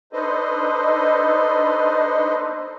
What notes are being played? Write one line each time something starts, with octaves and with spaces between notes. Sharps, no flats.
D4 D#4 A4 B4 C5 D#5